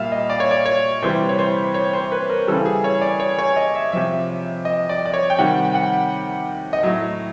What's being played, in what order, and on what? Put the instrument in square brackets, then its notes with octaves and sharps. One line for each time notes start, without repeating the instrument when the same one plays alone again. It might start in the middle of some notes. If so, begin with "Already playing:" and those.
Already playing: [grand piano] A#2 G3 E5 F5
D#5
D5
C#5
D5
C#5
C3 E3 G3 C5
C#5
C5
C#5
C5
B4
A#4
C#3 E3 G3 A4
G#4
C#5
D5
C#5
C#5
D#5
E5
C3 F3 E5
D#5
D5
D5
C#5
G5
C3 D#3 G3 F#5
G5
F#5
D#5
A2 F#3 E5